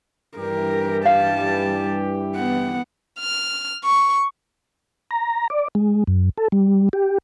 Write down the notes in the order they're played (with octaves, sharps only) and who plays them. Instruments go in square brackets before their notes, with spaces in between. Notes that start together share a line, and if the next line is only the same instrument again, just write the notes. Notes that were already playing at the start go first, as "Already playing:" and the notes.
[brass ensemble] G2 E3 G4 [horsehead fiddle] A#4
[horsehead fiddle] G3 A5 [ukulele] F5
[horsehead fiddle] B3 F#5
[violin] F6
C#6
[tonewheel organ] A#5
D5
G#3
F#2
A4
G3
G4